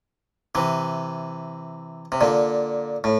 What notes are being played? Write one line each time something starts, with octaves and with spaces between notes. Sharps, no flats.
C3 E3
C3
A#2 D3
A2